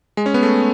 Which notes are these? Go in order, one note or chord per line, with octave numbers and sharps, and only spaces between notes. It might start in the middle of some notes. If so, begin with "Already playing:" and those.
G#3
C#4
B3
A3